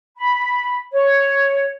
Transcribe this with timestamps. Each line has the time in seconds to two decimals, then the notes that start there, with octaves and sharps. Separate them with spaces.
0.18 B5
0.92 C#5